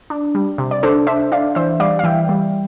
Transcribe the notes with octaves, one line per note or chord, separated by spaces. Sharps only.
D4
G3
C3
D5
D4 A4 C5
D4 C5 E5
D4 D5 F5
E3 C5 E5
G3 D5 F5
F5
E3 E5 G5
G3